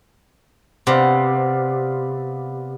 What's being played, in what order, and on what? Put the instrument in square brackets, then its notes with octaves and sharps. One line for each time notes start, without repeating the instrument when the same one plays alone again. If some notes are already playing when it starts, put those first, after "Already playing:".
[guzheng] C3 [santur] B3 D5 F5